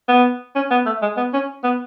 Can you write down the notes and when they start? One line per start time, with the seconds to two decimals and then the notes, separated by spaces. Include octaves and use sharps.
0.08 B3
0.55 C#4
0.71 B3
0.86 A3
1.02 G#3
1.17 B3
1.33 C#4
1.64 B3